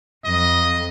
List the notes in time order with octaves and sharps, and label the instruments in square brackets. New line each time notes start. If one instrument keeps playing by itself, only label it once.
[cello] F2 [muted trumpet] D#5